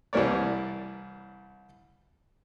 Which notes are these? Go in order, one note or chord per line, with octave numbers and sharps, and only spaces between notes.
C2 E3 G3 A#4 C#5 D5